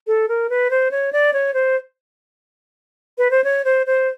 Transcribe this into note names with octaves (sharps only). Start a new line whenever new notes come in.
A4
A#4
B4
C5
C#5
D5
C#5
C5
B4
C5
C#5
C5
C5